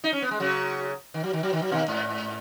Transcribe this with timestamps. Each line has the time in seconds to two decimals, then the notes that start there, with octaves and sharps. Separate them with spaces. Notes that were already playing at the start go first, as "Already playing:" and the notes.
0.04 D#4
0.13 C#4
0.22 B3
0.31 G#3
0.40 C#3 F#3
1.14 D#3
1.24 F#3
1.33 D#3
1.43 F#3
1.53 D#3
1.62 F#3
1.71 B2 D#3
1.88 G#2